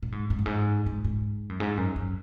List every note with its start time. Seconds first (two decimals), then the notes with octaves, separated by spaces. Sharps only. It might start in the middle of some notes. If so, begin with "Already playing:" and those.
0.03 A#2
0.12 G#2
0.30 G#2
0.39 F#2
0.46 G#2
0.86 G#2
1.04 G#2
1.49 F#2
1.60 G#2
1.77 F#2
1.96 F#2